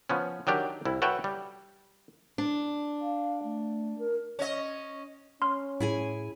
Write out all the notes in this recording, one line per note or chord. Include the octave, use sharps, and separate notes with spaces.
F3 B3 C#4
D#3 F#3 D4 G4 A#4
C2 E4
F#4 A4 B4 C#5 E5 G5
G3
D4
F5
A3
A#4
C#4 D#5
C#4 C6 F6
A2 E4 G#4 G#5